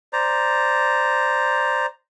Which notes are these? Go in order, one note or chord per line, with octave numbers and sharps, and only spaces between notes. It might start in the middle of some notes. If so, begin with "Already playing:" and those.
C5 D5 A#5